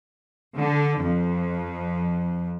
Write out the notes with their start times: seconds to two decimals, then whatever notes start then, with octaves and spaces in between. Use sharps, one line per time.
0.57 D3
1.02 F2